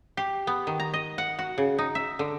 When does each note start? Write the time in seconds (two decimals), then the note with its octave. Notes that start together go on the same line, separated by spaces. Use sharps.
0.17 G4
0.47 B3
0.67 D#3
0.80 A#5
0.94 D#5
1.18 F#5
1.39 F#4
1.58 C#3
1.78 D#4
1.95 E5
2.19 D3